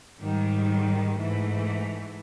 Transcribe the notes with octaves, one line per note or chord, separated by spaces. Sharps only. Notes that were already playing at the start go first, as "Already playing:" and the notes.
G#2 D#3 G3
G#2 E3 A3